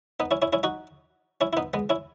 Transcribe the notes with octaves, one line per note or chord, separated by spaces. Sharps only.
B3 D#4
C#4 E4
C#4 E4
C#4 E4
D#4 F#4
C#4 E4
E4
B3 D#4
G#3 B3
C#4 E4